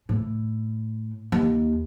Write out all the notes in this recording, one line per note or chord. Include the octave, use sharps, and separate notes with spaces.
A2
D#2